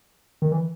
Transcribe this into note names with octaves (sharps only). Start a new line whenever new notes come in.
D#3
E3